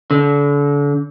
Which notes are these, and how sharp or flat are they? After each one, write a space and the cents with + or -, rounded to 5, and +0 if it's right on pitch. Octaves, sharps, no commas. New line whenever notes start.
D3 -35